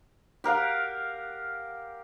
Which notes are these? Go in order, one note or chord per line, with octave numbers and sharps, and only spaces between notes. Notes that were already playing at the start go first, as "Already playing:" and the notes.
G4 A#4 F5 F#5